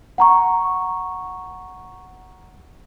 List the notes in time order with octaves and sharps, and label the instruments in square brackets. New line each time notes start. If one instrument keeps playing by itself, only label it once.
[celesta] F#5 A#5 C#6